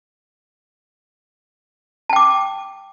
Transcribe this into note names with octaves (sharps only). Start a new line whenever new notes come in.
G5 A5 D6